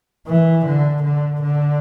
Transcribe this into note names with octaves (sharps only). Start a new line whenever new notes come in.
E3
D3
D3
D3